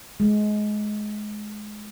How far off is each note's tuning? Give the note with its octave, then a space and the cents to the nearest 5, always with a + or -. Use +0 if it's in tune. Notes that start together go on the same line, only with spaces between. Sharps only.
G#3 +20